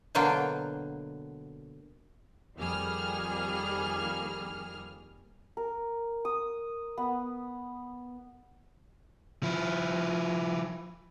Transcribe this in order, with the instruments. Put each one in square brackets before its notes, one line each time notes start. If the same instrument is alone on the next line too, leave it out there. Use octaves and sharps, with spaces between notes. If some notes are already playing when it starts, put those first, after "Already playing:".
[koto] B2 D3 F#3 A#3 G5
[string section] F2 D#3 G3 A#3 G#4 F6
[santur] A#4
D#6
B3
[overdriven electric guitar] F3 E4